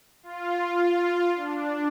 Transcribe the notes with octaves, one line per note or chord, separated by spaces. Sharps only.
F4
D4